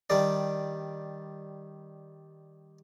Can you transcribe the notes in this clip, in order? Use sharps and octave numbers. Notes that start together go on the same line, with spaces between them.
D#3 G3 D4